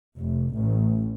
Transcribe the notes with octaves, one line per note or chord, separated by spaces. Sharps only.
F1
A1